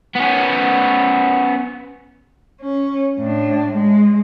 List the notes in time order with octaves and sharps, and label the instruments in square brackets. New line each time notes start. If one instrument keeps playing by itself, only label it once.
[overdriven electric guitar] B3 C#4
[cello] C#4
A2 D4
G#3